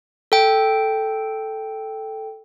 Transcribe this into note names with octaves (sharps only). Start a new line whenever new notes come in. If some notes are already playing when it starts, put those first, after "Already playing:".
A4 G5